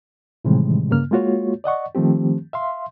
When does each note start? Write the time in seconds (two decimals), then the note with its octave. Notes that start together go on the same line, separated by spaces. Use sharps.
0.45 A2 C3 D#3 E3 G3 G#3
0.91 G2 C#3 A#3 F6
1.11 G#3 A#3 F4 F#4 C#5
1.64 D5 D#5 F#5 C#6
1.95 D#3 F3 A3 C4 G4
2.53 E5 F5 C6